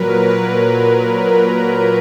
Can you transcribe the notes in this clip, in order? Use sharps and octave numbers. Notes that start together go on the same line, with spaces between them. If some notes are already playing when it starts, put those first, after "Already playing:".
Already playing: A#2 F#3 A#4 B4
B4